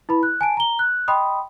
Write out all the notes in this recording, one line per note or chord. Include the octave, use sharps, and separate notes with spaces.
E4 B4 B5
F#6
G#5 A5 D7
A#5 G7
F#6
D#5 G5 B5 C6 D#6